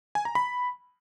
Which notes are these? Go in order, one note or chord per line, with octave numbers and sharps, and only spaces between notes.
G#5
A#5
B5